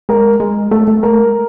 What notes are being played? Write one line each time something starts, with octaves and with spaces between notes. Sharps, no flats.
G#3 A#4
G#3
A3 A4
A3
A3 A#4
G#3